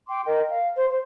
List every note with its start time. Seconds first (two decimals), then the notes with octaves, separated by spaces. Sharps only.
0.07 G5 C6 D6
0.25 A#4 D#5 G5
0.49 F5
0.75 C5
0.88 C5